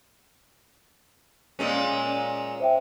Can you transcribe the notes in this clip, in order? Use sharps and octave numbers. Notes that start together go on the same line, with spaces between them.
A#2 G#3 C#4
C5 E5 G5